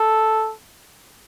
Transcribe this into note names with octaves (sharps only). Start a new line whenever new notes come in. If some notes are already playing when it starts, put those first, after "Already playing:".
Already playing: A4